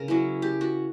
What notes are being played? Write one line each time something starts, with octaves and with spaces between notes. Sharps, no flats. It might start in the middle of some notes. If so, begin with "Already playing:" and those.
Already playing: C#3 A#4
F#3 C#4 E4
G4
F#4